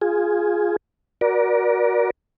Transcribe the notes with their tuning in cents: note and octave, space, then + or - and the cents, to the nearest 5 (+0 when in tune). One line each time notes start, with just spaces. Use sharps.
F4 +0 G#4 +0
F#4 +0 A#4 +30 D5 +0